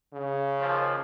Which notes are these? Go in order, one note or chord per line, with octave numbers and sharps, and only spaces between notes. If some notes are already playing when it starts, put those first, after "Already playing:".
C#3
D#2 F3